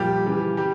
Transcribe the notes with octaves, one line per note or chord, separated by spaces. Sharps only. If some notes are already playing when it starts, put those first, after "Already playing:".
Already playing: A#2 F3 G3 G4
C#3 E3 G3
G3 G4